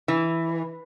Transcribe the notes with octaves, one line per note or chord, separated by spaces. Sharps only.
E3